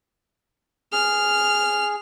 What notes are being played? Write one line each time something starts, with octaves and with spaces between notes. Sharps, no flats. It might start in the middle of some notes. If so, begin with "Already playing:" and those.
G#4 F6